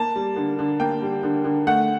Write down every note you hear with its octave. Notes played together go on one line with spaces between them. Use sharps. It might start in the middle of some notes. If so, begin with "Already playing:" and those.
Already playing: A#3 A5
G3
D3
D3
A#3 G5
G3
D3
D3
A3 F#5